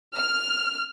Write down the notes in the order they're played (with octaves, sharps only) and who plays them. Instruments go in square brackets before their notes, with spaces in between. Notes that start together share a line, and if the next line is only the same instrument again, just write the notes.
[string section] F6